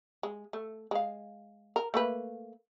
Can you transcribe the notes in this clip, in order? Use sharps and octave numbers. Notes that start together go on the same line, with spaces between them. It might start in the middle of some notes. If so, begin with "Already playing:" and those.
G#3
A3
G#3 F5
A#4
A3 A#3 B4